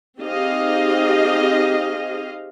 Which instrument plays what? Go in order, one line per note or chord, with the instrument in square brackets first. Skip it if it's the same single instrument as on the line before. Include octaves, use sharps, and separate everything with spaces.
[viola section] C4 D#4 G4 G#4 D#5 F5